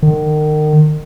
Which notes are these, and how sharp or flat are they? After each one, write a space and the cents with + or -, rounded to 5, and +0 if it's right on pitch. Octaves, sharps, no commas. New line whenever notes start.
D#3 -35